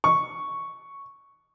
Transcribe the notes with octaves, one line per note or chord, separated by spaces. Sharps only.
C#6